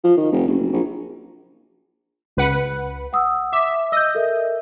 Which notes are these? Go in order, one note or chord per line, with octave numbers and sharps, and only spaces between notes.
F3
D#3
F1
F#1
A#1
C#2 B4 F#5
F#5 D#6 E6
E5 D6
D#5 E6 G6
A4 A#4 E5